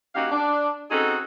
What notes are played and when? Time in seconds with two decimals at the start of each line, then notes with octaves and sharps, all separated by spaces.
0.15 A#3 C#4 D#4 F#4 G4 F5
0.32 D4
0.90 C4 C#4 D#4 F#4 G#4 A4